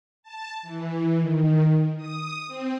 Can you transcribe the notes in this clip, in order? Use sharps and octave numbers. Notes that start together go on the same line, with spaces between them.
A5
E3
D#3
D#6
C4